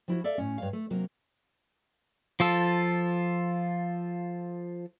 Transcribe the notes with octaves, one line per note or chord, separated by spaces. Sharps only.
F3 E4 F#4
A4 D5 E5 F5
A2 C#4
G2 C#5 F5
A3
C3 F#3 A#3
F3 F4 A4